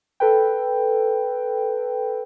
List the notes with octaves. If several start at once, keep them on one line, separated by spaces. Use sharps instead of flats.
A4 B4 G5